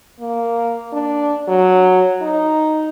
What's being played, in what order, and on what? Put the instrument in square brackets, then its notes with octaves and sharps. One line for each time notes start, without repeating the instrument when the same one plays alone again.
[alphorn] A#3
D4
F#3
D#4